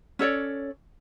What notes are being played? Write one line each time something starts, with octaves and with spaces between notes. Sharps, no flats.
C#4 A4 C#5 D5